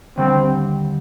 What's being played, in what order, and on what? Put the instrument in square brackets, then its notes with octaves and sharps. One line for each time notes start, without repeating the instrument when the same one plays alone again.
[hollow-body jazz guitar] D#2 D3 G3 [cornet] C4